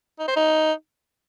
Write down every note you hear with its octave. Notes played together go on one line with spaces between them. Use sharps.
D#4
C5
D#4